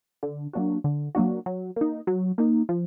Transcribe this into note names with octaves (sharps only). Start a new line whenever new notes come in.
D3
F#3 A#3 D4 F#4
D3
F#3 A#3 D4 F#4
F#3
A#3 D#4
F#3
A#3 D#4
F3